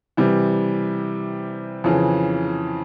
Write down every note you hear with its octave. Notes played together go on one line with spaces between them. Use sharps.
C3 E3 G3
F2 C#3 E3